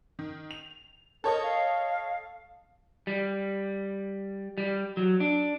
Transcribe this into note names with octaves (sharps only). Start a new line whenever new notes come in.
D#3
F7
A4 A#4 C#5 D#5
F5
G3
G3
F#3
D4